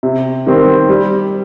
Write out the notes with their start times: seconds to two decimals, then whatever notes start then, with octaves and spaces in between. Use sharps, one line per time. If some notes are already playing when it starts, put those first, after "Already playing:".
0.03 C3
0.47 D#3 G3 C4
0.89 G3